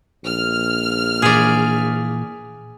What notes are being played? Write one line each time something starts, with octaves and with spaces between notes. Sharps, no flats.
A#1 F6
A#2 E3 G#4 D5